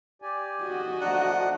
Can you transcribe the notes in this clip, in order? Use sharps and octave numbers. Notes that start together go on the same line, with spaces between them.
G4 D5 G#5
F#4 D#5
F3 A3 D4 F#5 A#5